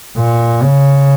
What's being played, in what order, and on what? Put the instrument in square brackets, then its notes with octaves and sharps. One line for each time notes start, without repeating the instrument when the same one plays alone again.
[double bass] A#2
C#3